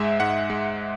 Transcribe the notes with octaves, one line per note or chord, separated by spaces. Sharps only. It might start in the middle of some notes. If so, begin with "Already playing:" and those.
Already playing: G#2 G#3 E5
G#2 F#5
G#3